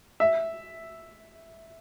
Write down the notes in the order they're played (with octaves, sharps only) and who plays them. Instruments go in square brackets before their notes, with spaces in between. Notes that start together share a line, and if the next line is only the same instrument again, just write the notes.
[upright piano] E5